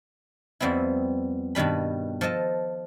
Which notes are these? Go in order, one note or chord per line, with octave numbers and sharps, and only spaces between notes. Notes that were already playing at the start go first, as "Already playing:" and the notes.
F2 G3 B3 C4 E4
G2 B2 D#3 G3 B5
F3 A4 D#5 A5